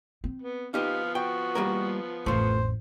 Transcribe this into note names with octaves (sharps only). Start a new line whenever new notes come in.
C4
B3
F3 B3 D#4 G4 F5
F#4 G5
G3 A#3 A#4
A1 F2 A3 F4 C5